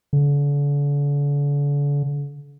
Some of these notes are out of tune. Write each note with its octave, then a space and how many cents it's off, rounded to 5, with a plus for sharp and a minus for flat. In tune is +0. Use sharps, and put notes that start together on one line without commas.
D3 -40